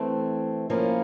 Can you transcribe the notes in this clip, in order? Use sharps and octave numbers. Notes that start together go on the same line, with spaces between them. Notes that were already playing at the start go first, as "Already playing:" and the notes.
Already playing: E3 A3 C4
F3 A#3 C#4 E4